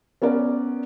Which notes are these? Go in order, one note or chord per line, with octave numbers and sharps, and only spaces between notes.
B3 C#4 A#4 D5